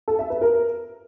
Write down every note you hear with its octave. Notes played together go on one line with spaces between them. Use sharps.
A4
E5
B4
A#4